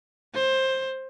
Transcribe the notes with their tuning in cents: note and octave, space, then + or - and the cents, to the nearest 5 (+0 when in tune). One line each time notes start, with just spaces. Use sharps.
C5 +15